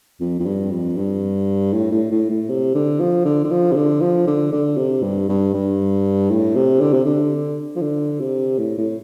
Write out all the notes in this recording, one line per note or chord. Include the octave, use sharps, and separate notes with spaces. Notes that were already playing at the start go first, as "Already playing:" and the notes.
F2
F2
G2
F2
G2
A2
A2
A2
A2
C3
D3
F3
D3
D3
F3
C3
D3
F3
D3
D3
C3
G2
G2
G2
A2
C3
D3
C3
D3
F3
D3
C3
A2
A2